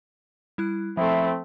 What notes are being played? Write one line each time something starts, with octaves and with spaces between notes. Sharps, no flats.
G3 E4 F#6
F3 A3 C4 E4